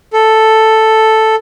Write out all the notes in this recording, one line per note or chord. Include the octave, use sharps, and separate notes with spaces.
A4